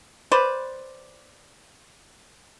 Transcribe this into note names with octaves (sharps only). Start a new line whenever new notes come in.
B4 C5 D5